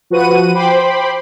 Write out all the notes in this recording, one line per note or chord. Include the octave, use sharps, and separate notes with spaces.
F3 F#4 B4 F#5 D#7
C5 G5 B5 C6 D6